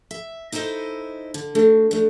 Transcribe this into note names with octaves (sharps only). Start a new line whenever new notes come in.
E5
D#4 E4 A4 C5 D#5
D3
A3 D4 F#4
A3 D4